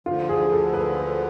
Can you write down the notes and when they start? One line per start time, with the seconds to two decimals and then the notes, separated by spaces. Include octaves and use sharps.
0.06 D2 D3 F3 F4
0.29 G#4
0.51 A4
0.74 B4